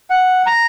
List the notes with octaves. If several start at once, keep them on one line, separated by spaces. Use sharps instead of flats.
F#5
A#5